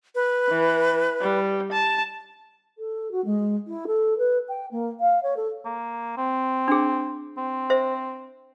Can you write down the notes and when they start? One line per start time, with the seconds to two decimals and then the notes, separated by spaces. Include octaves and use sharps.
0.15 B4
0.49 E3
1.21 G3
1.72 A5
2.78 A4
3.11 F#4
3.25 G#3
3.67 E4
3.87 A4
4.18 B4
4.49 G5
4.71 A#3
5.00 F5
5.23 C#5
5.36 A4
5.65 A#3
6.17 C4
6.68 D4 G#4
7.37 C4
7.70 C5 E5